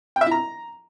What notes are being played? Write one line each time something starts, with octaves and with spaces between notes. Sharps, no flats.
G5
E5
E4
A#5